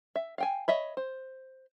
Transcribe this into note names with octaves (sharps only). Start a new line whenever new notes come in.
E5
F5 G5 G#5
C#5 D#5 E5 B5
C5